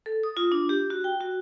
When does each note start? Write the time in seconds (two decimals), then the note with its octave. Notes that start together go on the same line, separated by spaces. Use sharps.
0.06 A4
0.23 D#6
0.37 F4
0.52 D4
0.69 G4
0.90 F#4
1.04 G5
1.21 F#4